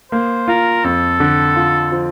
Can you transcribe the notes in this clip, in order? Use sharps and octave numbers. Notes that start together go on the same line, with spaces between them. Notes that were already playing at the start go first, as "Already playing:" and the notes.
A#3 C5
F4 A#4
F2 A4
D3
F4
F3